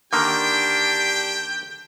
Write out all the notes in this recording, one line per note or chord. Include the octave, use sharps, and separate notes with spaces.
D3 D#3 A#3 D4 G4 G5